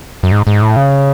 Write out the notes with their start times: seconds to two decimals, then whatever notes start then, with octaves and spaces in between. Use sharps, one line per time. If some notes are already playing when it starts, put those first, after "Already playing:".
0.23 F#2
0.32 G#2
0.47 G#2
0.62 A2
0.76 C#3